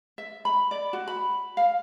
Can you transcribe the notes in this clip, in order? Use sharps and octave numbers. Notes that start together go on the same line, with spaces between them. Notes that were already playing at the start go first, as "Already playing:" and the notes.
E5
B5
D5
F#4
B5
F5